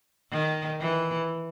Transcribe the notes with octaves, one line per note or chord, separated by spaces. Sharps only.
D#3
E3